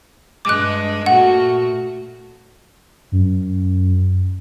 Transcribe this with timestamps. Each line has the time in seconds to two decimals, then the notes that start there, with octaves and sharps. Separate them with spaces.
0.45 G2 G#3 D6 F#6
1.06 A#2 A3 F#4 F#5
3.12 F#2